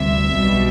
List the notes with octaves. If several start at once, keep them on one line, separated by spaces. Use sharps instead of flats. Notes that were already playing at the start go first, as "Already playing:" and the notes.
Already playing: D2 C3 E3 G3 E5
B1 B2 G3